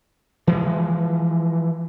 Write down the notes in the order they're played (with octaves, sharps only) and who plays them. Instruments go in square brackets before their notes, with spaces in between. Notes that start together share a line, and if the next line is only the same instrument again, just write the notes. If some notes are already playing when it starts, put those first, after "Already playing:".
[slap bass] E3 F3 G#3